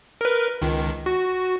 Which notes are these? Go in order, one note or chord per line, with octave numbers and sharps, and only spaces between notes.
A#4 B4
C#2 D#3
F#4